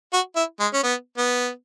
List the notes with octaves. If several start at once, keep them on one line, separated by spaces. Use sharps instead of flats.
F#4
E4
G#3
C#4
B3
B3